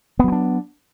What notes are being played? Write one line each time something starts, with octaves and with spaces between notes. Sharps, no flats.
F#3 B3 C4 D4